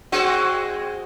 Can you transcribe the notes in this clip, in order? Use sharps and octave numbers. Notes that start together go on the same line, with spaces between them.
G#3 C4 F#4